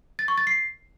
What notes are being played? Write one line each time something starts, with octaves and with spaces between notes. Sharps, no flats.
A6
C#6
A6
C7